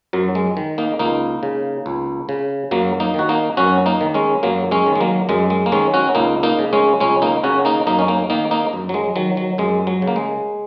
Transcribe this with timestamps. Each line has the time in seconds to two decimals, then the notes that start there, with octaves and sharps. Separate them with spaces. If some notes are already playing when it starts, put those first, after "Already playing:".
0.13 F#2 F#3
0.35 G#3
0.57 D#3
0.78 A#3 D#4
0.99 C#2 A#3 D#4
1.43 C#3
1.86 C#2
2.29 C#3
2.71 F#2 F#3 A#3
3.00 A#3 D#4
3.14 D#3 F#4
3.29 A#3 D#4
3.57 F#2 C#4 F#4
3.86 A#3 D#4
4.01 D#3
4.14 G#3 C#4
4.43 F#2 F#3 A#3
4.71 G#3 C#4
4.87 D#3
4.95 G#3
5.00 F#3 A#3
5.29 F#2 G#3
5.50 G#3
5.66 A#3
5.72 D#3 G#3 C#4
5.94 C#4 F#4
6.15 C#2 A#3 D#4
6.43 A#3 D#4
6.59 C#3
6.73 G#3 C#4
7.00 C#2 G#3 C#4
7.22 A#3 D#4
7.44 C#3 C#4 F#4
7.65 A#3 D#4
7.87 F#2 A#3 D#4
7.99 C#4
8.08 A#3 D#4
8.30 D#3 A#3 D#4
8.51 A#3 D#4
8.73 F#2
8.89 F#3
8.94 G#3
9.16 D#3 F#3
9.37 F#3
9.58 F#2 G#3
9.87 F#3
10.02 C#3
10.07 A#3
10.16 G#3